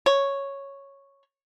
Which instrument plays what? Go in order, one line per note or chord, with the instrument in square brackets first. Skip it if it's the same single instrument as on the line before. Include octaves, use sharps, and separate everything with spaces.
[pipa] C#5